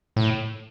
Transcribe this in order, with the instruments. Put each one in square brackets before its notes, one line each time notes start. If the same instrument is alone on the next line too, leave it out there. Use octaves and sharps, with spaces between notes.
[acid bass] A2